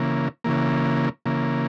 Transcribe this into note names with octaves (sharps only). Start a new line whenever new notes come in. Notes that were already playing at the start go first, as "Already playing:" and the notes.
Already playing: C#3 E3 A#3
C#3 E3 A#3
C#3 E3 A#3